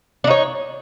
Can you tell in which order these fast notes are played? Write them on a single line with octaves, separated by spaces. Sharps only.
D4 D#4 C#5